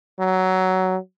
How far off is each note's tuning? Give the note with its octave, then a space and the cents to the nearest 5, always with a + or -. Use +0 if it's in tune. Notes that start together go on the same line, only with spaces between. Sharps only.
F#3 +15